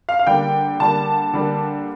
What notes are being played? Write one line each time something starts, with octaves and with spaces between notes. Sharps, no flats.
F5
F5
D3 G3 A#3 G5
D3 G3 A#3 A5
D3 G3 A#3